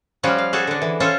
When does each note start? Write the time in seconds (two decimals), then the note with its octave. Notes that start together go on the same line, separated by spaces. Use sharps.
0.23 F3 G3 C#4 F4 F#4
0.38 F5
0.53 F#4 G#4 A4
0.67 D3 D4
0.82 E3
1.00 C#4 F4 A4 C5 C#5